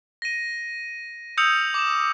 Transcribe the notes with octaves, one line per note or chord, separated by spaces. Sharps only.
A#6 D#7
D#6 E6 G6 C#7 F7
D6 E7